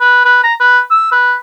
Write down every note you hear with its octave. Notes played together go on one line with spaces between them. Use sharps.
B4
B4
A#5
B4
E6
B4